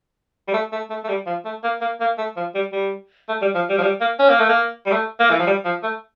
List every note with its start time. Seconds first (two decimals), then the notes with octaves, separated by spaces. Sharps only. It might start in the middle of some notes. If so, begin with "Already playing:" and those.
0.48 G3
0.54 A3
0.72 A3
0.90 A3
1.04 A3
1.09 G3
1.26 F3
1.45 A3
1.64 A#3
1.81 A#3
2.01 A#3
2.18 A3
2.37 F3
2.55 G3
2.72 G3
3.28 A3
3.42 G3
3.55 F3
3.70 G3
3.78 F3
3.83 G3
4.01 A#3
4.19 C#4
4.29 A#3
4.39 A3
4.49 A#3
4.86 G3
4.92 A3
5.20 A#3
5.30 E3
5.39 F3
5.47 G3
5.65 F3
5.83 A3